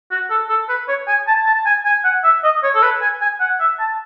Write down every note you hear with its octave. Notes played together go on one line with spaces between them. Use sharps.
F#4
A4
A4
B4
C#5
G#5
A5
A5
G#5
G#5
F#5
E5
D#5
C#5
A4
B4
G#5
G#5
F#5
E5
A5